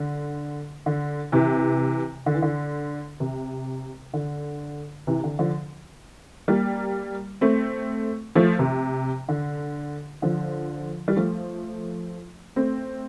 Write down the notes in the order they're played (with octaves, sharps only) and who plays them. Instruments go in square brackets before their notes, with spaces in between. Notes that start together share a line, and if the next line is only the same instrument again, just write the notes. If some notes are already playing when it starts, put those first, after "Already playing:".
Already playing: [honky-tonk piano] D3
D3
C3 E3
D3
E3
D3
C3
D3
C3 E3
D3
D3 F3
G3 A#3
A3 C4
F3 A3
C3
D3
D3 F3
G3
F3 A3
A3 C4